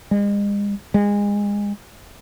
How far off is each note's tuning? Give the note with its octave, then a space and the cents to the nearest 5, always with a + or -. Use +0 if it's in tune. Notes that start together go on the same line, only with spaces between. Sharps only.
G#3 -40
G#3 -25